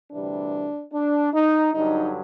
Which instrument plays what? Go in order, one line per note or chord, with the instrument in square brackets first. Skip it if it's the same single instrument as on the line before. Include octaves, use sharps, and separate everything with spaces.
[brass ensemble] D2 C3 E3 G3 D4
D4
D#4
G2 D3 F#3 D#4